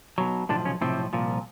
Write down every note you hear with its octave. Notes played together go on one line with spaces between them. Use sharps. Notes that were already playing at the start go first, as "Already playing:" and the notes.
B1 B2 F#3
B1 A2 D3 F3 D4
C#3 C#4
B1 A2 C3 F3 C4
C2 A#2 F3